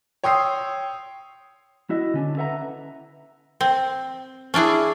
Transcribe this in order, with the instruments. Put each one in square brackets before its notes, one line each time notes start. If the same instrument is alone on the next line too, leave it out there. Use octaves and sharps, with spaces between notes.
[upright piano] C#5 G5 C6 D#6 E6 C7
[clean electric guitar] E4 F#4 D#5
D3 C#4 D4
A4 B4 E5 F#5 G5 A#5
[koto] C4
C#4 D4 E4 G#4